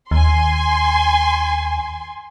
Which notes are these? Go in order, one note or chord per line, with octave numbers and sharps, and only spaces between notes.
D#2 G#5 C6